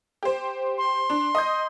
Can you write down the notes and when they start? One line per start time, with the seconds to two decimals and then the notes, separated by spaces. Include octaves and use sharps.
0.23 G4 C5
0.78 C6
1.10 D4
1.35 D#5 D#6 G6